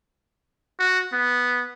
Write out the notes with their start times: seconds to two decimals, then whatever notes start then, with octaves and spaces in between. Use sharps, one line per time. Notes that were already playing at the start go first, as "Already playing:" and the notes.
0.79 F#4
1.13 B3